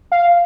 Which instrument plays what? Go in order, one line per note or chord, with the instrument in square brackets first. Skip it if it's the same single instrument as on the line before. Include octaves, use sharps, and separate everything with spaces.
[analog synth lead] F5